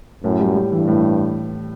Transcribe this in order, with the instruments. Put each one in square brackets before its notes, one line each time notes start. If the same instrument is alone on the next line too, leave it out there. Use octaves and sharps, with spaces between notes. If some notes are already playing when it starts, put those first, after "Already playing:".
[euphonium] F#2 [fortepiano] A2
[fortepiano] G3
G3
[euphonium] G2 [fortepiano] E3
[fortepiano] A2